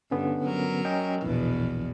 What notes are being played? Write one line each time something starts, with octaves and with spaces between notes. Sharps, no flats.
G2 D3 B3 C#4
F#3 A#4
C#4 D#5 G5
A#1 E2 B2 E3